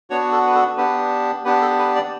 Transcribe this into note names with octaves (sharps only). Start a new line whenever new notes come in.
B3 D4 F#4 C#5
A4
B4
A4
B3 D4 G4 B4
B3 D4 G4 B4
A4
B4
D5